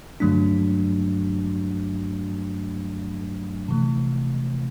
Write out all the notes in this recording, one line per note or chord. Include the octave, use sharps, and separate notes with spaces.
G2 D3 F#3 A3 D4
C3 E3 A3